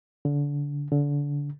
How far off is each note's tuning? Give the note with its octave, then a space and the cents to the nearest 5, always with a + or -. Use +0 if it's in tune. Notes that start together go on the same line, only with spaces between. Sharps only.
D3 -30
D3 -30